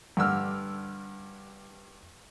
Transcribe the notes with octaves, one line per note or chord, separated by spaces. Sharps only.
G2 D3 E6 F6